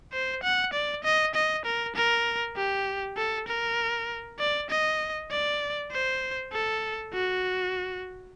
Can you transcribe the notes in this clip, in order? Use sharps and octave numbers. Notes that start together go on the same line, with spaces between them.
C5
F#5
D5
D#5
D#5
A#4
A#4
G4
A4
A#4
D5
D#5
D5
C5
A4
F#4